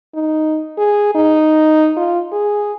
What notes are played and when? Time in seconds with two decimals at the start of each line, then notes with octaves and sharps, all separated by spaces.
0.15 D#4
0.78 G#4
1.15 D#4
1.97 F4
2.33 G#4